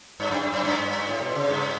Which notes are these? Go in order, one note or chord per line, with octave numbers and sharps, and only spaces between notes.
G2
F#2
F#2
F#2
G2
A2
B2
C#3
G2